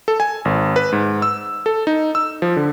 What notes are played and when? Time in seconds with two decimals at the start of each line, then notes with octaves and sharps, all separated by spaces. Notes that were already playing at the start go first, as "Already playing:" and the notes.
0.08 A4
0.20 G#5
0.45 G#1
0.76 B4
0.92 G#2
1.22 E6
1.66 A4
1.87 D#4
2.15 E6
2.42 F3
2.57 D3